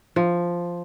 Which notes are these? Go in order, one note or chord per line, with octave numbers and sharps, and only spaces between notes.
F3